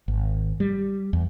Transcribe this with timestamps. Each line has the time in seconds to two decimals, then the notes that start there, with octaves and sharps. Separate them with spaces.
0.08 G#1
0.60 G3
1.13 E2